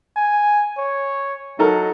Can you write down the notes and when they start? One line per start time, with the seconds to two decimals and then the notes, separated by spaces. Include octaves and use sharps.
0.17 G#5
0.78 C#5
1.59 F#3 D#4 A4 A#4